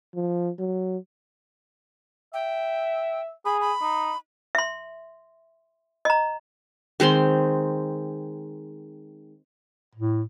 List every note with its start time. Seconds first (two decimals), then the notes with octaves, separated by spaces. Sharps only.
0.15 F3
0.59 F#3
2.34 E5 G5
3.45 G#4 B5
3.61 B5
3.81 D#4
4.55 E5 C6
6.05 D#5 A#5
7.00 D#3 G#3 C4 C6
9.95 A2